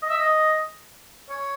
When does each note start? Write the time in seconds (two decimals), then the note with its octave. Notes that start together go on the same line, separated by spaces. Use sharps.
0.02 D#5
0.10 E5
0.18 D#5
1.30 C#5